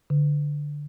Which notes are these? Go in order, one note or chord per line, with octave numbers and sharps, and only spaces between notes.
D3